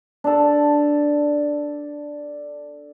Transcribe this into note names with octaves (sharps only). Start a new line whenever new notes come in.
D4 A4